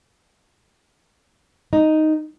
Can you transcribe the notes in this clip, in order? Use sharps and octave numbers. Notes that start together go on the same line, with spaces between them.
D#4